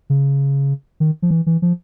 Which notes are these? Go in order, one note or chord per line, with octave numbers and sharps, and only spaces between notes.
C#3
D#3
F3
E3
E3
F3